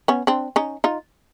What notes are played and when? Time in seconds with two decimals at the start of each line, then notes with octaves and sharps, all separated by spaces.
0.08 B3 C#4
0.27 C4 D4
0.56 C#4 D#4
0.84 D#4 F4